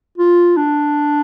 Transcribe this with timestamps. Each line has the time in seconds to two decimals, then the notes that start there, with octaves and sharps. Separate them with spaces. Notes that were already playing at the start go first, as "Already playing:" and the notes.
0.18 F4
0.57 D4